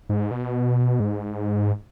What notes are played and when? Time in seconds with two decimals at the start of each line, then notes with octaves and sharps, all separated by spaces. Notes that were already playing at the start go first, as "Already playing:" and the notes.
0.09 G#2
0.31 B2
1.00 G#2